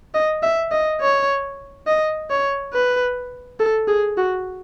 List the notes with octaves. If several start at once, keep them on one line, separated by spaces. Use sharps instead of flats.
D#5
E5
D#5
C#5
D#5
C#5
B4
A4
G#4
F#4